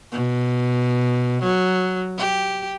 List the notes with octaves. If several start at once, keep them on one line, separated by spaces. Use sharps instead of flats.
B2
F#3
G4